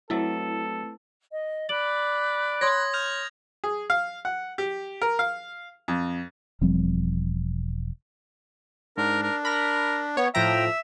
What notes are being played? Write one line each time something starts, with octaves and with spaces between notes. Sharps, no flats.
F#3 A3 C4 E4 A4 B4 E5 A5
D#5
D5 B5 D6 F#6 F#7
C#5 C6 D#6 G#6 A#6
F6 G6 F7
G#4
F5
F#5
G4
A#4
F5
F2
E1 F3 G3 C4
G#2 D4 A#4
A#4
A#4 B5 A#6
B3 C#5
A2 F3 E5 G5 A#5